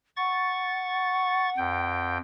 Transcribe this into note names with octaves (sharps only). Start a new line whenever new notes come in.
F#5 C#6 A6
F2 G5